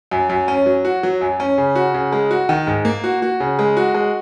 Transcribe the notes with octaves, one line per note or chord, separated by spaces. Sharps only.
F#2
F#2
C#4
F#3
F#4
F#3
F#2
C#4
C#3
F#4
C#3
G#3
F#4
D#3
G#2
A#3
F#4
F#4
C#3
G#3
F#4
G#3